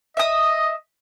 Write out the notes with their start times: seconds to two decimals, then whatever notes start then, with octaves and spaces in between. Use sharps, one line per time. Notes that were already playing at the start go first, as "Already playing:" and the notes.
0.17 D#5 E5 D#6